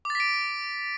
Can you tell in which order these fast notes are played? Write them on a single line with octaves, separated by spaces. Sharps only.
D6 A6 B6 D7